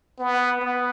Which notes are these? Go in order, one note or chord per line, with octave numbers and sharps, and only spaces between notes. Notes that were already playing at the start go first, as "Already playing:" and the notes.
B3
B3